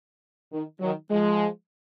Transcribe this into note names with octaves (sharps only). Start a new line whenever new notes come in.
D#3
D#3 F#3
F3 G#3